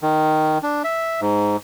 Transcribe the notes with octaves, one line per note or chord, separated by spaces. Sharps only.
D#3
D4
E5
G#2